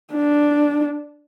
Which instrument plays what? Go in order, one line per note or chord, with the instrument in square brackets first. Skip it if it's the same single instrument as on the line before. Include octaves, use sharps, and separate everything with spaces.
[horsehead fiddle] D4